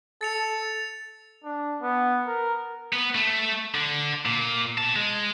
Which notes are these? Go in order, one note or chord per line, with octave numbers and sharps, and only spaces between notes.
A4 A6 C#7 F7
D4
B3
A#4
B3
A3
D3
A#2
B2 A5
G#3